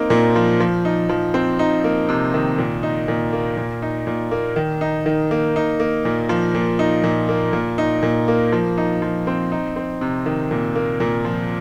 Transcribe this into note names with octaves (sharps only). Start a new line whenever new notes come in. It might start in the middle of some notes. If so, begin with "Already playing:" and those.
Already playing: A#3 C4 D#4
A#2
F3
F3
D#4
F3
C4
D#4
A#3
C3
D#3
A#2
D#4
A#2
A#3
A#2
D#4
A#2
A#3
D#3
D#4
D#3
A#3
D#4
A#3
A#2
F3
A#2
D#4
A#2
A#3
A#2
D#4
A#2
A#3
F3
D#4
F3
C4
D#4
C4
C3
D#3
A#2
A#3
A#2
F3